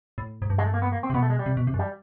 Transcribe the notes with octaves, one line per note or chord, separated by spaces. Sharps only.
A2
G#2
G2
G#3
A3
A#3
B3
A#3
C4
C3
B2 B3
A3
G#3
G3
C3
B2
C3
F#2
G3